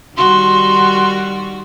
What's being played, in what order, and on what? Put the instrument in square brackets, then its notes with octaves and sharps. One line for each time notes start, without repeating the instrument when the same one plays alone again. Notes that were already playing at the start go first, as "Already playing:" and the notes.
[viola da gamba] D#3 G3 F#4 [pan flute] C6